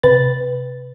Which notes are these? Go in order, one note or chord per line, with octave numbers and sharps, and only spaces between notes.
C3 B4 A6